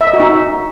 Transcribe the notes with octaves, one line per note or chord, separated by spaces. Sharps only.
E5
D#5
F#4
D#4